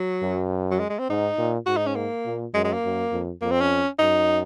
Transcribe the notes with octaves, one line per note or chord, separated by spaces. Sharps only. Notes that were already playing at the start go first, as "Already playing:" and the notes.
Already playing: F#3
F#2
F#3
G#3
G#3
C4
G#2 D#4
A#2
G#2 F#4
D#4
C#4
A#3
A#2
F#2 G#3
G#3
A#3
F#2
F2
F2 A#3
C4
C#4
F#2 D#4